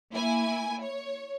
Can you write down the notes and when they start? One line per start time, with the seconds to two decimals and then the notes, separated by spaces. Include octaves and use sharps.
0.13 A#3 E4 G#5
0.82 C#5